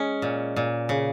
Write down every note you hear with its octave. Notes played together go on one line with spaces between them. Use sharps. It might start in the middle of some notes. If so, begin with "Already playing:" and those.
Already playing: G#3 C#4
A#2
A#2
C#3